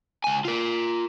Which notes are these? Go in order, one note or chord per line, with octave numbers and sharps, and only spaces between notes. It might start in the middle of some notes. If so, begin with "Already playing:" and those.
C#2 G#5
F4 A#4